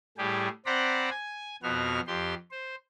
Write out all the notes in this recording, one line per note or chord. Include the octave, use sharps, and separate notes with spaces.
A2 G3 G4 G#4
C4 C5 D5 F#5 A#5 B5
G#5
F2 B2 B3 F#4 F6
F2 G4 C6
C5